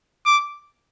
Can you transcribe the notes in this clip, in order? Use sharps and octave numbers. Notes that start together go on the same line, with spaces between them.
D6